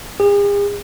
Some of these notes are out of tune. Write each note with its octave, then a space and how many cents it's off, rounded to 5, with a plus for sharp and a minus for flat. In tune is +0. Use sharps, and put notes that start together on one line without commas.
G#4 -45